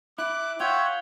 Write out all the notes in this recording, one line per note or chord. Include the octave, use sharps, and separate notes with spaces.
E4 D6 F#6
F4 C#5 E5 F#5 G5 G#6